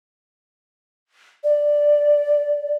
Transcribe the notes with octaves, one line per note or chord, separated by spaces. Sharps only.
D5